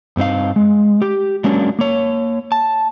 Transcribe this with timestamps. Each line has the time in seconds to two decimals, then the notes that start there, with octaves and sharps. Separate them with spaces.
0.17 G2 C4 D#4 F5
0.56 G#3
1.02 G4
1.44 F#3 G#3 A#3 C#4 D4
1.79 A#3 C#5
2.52 A5